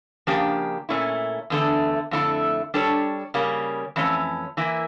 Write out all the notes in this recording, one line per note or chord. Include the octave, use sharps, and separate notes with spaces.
C#3 F3 A#3 D4 G4
A#2 A3 C#4 E4
E2 D3 A3
F2 D3 A3 E4
G3 D4 A4 C#5
C#3 G3 A#3 C#4
F2 E3 A3 C#4
E3 A#3 E4